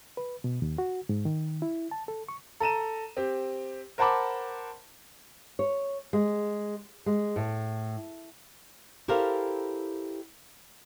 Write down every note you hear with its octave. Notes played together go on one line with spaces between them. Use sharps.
B4
B2
D#2
F#4
G#2
D#3
E4
A5
A4
C#6
A4 A#5 D#7 E7
C4 G4
A#4 C5 F#5 A5 B5 D6
C#5
G#3
G#3
A2
E4 G4 A4 A#4 C5 F5